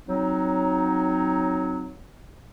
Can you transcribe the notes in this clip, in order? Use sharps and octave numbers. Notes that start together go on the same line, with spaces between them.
F#3 C4 D#4